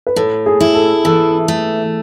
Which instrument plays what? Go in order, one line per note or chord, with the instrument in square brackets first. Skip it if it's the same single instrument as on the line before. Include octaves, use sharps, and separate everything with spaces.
[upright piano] B4
[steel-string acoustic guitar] A2 [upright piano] A4
[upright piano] G#4
[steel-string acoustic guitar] E4
[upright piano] A4
[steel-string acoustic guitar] E3 [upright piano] A4
[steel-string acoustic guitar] A3